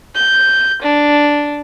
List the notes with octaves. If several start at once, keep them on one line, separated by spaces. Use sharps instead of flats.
G6
D4